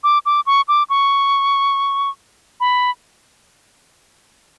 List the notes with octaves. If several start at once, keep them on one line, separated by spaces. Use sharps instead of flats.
D6
D6
C#6
D6
C#6
B5